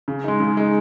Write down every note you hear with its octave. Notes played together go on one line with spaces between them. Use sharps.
C#3
G#3 D#4
C#3
G#3 D#4